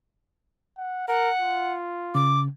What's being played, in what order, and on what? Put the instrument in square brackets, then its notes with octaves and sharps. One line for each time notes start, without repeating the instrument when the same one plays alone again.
[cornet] F#5
[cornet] A#4 [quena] F#5
[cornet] F4
[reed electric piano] C#3 [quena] D6